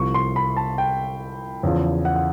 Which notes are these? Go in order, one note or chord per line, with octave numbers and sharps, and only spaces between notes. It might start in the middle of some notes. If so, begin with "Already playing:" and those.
Already playing: C2 C3 F3 C#6
C6
B5
A5
G5
E2 C#3 F3
F#5
F#5